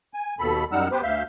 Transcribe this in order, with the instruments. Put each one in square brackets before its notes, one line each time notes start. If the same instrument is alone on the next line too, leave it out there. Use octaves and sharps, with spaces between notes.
[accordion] G#5
D#2 B2 A4 B5
F#2 G3 D#4 F#5 E6 F6
B3 G4 B4 C5
D2 E5 F5 G6